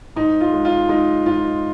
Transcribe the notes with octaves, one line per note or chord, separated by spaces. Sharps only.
G#2 D#4
F4
G#3
F4
G#3 D#4
G#2 F4